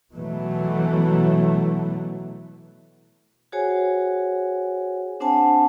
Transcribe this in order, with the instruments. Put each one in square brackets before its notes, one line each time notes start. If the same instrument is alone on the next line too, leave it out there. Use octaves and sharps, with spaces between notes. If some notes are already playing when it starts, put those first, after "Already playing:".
[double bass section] B2 E3 F#3 A3
[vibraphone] F#4 G#4 C5 C#5 F#5 G#5
C4 D4 C5 F#5 G#5 A5